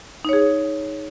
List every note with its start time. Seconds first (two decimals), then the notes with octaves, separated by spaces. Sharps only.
0.25 D#4
0.29 C#5
0.33 G#4